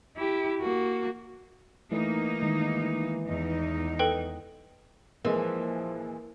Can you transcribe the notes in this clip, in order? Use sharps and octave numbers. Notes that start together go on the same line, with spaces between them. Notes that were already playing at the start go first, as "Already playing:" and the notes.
E4 G4
A#3 F#4
E3 A3 A#3 D#4
D#3 G#3
E2 D#4
A4 B4 G5
A#2 E3 F3 G#3 A#4